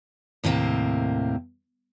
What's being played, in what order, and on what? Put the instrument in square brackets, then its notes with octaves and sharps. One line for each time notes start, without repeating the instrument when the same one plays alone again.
[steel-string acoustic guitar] D#2 A2 C3 A#3 C4